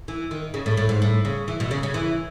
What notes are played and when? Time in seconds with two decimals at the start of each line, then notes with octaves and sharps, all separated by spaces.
0.08 E3
0.31 D#3
0.54 C#3
0.66 A2
0.77 A2
0.89 G#2
1.02 A2
1.25 C#3
1.48 E3
1.60 B2
1.71 C#3
1.83 C#3
1.94 E3